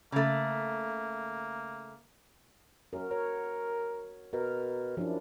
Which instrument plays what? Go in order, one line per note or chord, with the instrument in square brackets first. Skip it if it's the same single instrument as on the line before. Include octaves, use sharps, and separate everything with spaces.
[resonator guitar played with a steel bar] C#3 A3 [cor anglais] A#3
[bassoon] F#2 [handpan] F#4 A#4
[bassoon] A#4 [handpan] C#5
[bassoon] B2 [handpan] A#4
[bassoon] F#2 [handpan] F3 D4 E4